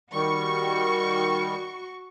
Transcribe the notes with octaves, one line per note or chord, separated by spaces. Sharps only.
D#3 G3 F#4 C#6